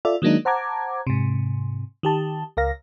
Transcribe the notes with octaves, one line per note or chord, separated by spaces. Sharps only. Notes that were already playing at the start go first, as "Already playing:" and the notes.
F4 A4 D5 E5
D#3 F#3 G#3 A#3 D4 D#4
C5 F#5 A5 A#5 D6 G#6
G#2 C3
D#3 G4 A5
C#2 A#4 F5 A#6